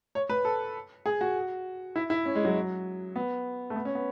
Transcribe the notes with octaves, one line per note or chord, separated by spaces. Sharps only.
C#5
B4
A4
G#4
F#4
E4
E4
C#4
G#3
F#3
B3
A3
B3
C#4
B3